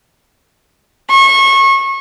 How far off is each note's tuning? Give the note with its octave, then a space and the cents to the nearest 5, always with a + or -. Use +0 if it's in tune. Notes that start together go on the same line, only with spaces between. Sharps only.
C#6 -30